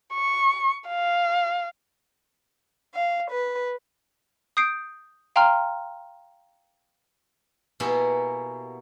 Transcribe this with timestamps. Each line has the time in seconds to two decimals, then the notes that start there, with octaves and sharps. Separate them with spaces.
0.14 C#6
0.88 F5
2.95 F5
3.30 B4
4.57 D#6 G6 C7 D7
5.36 F5 G5 A#5 C6 F6
7.80 B2 A#3 B3 E4 G4 G#4